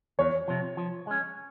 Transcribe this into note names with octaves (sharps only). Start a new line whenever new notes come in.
E2 C#5
C3 F3
F3
G#3 C#4